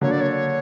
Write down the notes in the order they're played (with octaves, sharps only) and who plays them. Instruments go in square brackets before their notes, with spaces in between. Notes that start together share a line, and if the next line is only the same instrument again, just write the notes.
[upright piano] D3 F#3 A#3 [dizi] C#5
[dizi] D5
C#5